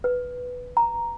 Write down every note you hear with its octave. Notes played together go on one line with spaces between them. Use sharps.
B4
A#5